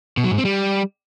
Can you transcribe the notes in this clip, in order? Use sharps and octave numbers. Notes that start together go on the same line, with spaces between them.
B2
F#3
G#2
C4
G3